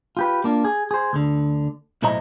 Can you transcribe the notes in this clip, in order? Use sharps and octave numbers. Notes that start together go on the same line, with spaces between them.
F4 G4 B4
A#3 D4 F4
G#4
G#4 C5
D2 D3
B1 A2 E4 C5 D#5 A#5